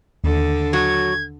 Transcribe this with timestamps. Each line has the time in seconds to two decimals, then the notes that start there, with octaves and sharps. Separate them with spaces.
0.24 D#2 D3 A4
0.73 F#3 F#4 G#6